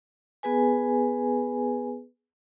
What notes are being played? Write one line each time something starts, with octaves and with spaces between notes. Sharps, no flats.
B3 G#4 B4 G#5